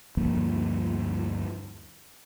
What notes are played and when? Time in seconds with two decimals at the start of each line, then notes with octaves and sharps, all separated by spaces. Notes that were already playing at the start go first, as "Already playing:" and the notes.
0.17 D2 G2 F3 A#3